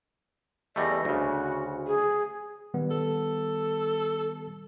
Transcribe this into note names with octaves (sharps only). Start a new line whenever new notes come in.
E2 G3 A3 D#5
D2 C#3 F#4
G#4
D#3 G3 B3
A4